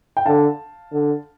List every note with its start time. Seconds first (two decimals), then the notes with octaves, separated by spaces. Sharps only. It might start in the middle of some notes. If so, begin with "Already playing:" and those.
0.17 G5
0.25 D3 F5 A5
0.92 D3